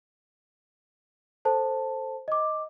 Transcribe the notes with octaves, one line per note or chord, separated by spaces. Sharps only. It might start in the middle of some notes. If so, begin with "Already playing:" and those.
A4 C5 A5
D#5 D6